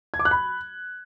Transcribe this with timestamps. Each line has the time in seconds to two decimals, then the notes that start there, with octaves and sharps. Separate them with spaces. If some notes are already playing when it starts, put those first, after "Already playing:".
0.14 G#6
0.19 D6
0.25 F#6
0.31 B5